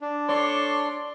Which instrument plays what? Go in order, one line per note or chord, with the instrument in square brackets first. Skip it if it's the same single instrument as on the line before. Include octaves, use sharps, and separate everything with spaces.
[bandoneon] D4
[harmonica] A4 C#5 C6 [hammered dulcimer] D5